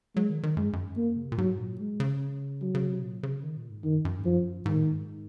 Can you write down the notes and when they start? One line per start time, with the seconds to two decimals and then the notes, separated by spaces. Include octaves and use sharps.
0.16 F#3 G#3
0.30 D#3
0.43 D#3
0.57 F#2 G#3
0.65 G#2
0.73 F#2
0.97 A#3
1.16 C#3
1.25 C3
1.32 A#2
1.38 G#2 F#3
1.59 A#2
1.79 G#3
2.00 C#3
2.61 F#3
2.75 C#3
2.89 C3
3.02 A#2
3.23 C#3
3.43 D#3
3.57 A#2
3.70 G#2
3.84 F#2 D#3
4.05 F#2
4.19 G#2
4.25 F#2 F3
4.65 G#2 D#3
4.75 A#2
4.85 G#2